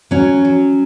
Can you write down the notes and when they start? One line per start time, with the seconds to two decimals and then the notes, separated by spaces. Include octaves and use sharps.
0.11 F#3 C#4
0.45 F#3